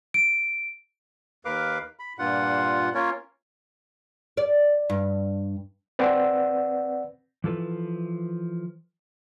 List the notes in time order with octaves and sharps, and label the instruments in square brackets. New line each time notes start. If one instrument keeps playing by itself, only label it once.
[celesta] D7
[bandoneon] D#2 A#4 B4 F5 D6
B5
G2 A#2 F4 F#5
A#3 C#4 F4 A#4 C#5
[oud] D5
G2
[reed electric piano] C4 B4 D5 F#5 E6
[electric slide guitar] E3 F3 A4 B4